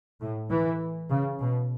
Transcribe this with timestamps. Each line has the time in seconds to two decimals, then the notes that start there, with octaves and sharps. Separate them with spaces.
0.21 A2
0.50 E3
1.10 C#3
1.40 B2